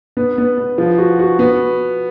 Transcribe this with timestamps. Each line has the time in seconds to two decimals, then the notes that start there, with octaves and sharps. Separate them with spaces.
0.17 B3
0.38 B3
0.58 B3
0.78 F3
0.98 F#4
1.19 F#4
1.39 B3